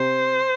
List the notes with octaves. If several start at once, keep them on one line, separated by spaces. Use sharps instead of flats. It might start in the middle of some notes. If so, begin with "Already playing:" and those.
Already playing: C3 C5